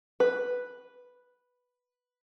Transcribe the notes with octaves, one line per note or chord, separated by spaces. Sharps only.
B4